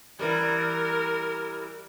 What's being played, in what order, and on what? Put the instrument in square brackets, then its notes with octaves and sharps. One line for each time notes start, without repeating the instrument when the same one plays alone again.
[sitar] E3 G3 [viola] A#4